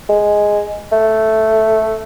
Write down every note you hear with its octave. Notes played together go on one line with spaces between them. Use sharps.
G#3
A3